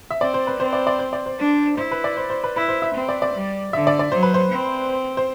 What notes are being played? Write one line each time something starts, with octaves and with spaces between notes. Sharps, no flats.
E5
C4 D5
C5
B4
C4 C5
D5
D5
C5
D5
C5
D4
E4 C5
B4
D5
C5
C5
B4
E4 B4
C5
E5
C4
D5
D5
G3
D3 E5
D5
D5
F#3 C5
B4
C5
C4
C5